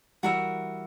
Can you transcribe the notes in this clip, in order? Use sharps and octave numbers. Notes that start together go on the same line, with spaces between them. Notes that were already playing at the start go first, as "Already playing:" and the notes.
E3 G3 F#4 A#4 E5